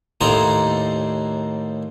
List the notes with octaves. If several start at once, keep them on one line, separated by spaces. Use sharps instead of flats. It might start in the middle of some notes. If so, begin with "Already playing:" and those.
D#2 A2 D#4 C5 D5 A#5